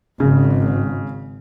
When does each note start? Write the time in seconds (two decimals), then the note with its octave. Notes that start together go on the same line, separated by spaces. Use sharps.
0.20 G#1 C#3